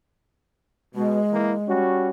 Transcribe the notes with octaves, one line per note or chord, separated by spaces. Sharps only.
B2 G#3
E3 A#3
G3 C#4 F#4